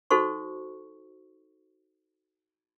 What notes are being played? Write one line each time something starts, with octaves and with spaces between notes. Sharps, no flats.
D#4 F#4 A4 C5 C#6